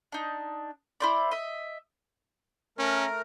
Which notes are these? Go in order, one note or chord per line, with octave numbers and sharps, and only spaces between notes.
D4 D#4
E4 C5 D5
D#5 E5
A3 C#4 A#4